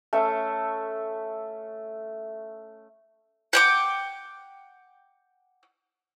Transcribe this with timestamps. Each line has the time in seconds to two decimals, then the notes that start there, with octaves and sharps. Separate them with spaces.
0.13 A3 C#4 E5
3.53 F#5 G5 D6